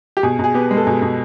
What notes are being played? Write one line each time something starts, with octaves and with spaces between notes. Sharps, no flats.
G4
B2 G#4
B2 G#4
B3 G4
G#3
A4
B2 G#4
B2